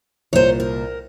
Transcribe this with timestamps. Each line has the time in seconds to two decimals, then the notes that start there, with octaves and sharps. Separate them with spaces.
0.33 C2 A#2 A#3 C5 C#5
0.60 A#4